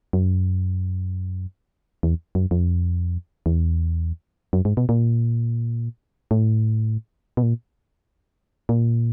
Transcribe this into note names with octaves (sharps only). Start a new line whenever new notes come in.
F#2
E2
F#2
F2
E2
F#2
G#2
B2
A#2
A2
B2
A#2
A#2